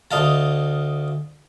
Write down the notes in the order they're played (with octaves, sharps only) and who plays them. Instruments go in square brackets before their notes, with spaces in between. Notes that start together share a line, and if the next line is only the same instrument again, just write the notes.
[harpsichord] D2 D#5 F5 A5